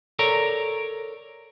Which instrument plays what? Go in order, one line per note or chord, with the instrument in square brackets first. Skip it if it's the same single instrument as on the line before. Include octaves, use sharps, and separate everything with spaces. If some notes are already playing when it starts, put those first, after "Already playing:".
[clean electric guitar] A4 A#4 C#5 D5 A#5